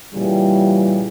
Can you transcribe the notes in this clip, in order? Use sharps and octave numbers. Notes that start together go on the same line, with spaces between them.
A#2 C#3 E3 G3